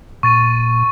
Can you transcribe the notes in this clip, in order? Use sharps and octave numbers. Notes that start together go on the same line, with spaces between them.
A#2 C#6 A6 D#7